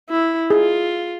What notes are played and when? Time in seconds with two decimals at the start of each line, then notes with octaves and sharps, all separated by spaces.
0.10 E4
0.50 F4 G#4